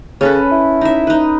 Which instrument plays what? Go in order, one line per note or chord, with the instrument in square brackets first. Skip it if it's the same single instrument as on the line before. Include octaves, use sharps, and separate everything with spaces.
[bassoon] C#3 [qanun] C#4 A4 B4
[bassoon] E4
[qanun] D#4 E5
D#4 B4